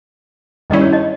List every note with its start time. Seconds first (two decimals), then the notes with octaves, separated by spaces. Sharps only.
0.70 G2 D#3 G3 C#4 E4 D#5
0.82 C#5
0.92 D#4 D#5